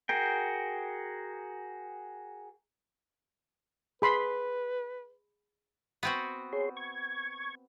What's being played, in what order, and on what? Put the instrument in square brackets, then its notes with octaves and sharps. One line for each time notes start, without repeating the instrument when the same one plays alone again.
[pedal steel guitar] F#4 G#4 A#4 G5
[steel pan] G#4 B5 C6 [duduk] B4
[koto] B3 C4 F#4
[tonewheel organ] G#4 C#5 C6
C#6 G#6